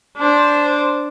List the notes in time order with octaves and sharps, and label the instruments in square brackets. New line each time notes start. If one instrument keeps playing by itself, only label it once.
[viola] D4 C5